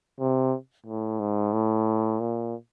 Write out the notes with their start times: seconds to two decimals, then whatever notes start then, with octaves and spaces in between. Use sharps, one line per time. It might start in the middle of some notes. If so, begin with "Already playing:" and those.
0.20 C3
0.86 A2
1.20 G#2
1.53 A2
2.20 A#2